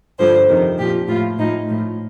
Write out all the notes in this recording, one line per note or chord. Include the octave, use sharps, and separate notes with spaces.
G2 D3 F3 C5
F2 C3 D#3
A#2 F3 G4
A2 F3 F4
A2 F3 D#4
A2 F3